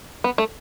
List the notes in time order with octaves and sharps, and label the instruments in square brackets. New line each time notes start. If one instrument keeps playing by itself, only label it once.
[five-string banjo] B3
A3